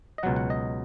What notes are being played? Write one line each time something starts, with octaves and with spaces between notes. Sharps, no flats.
D#5
C#2 B2 F#3 F#5
F#5
D#5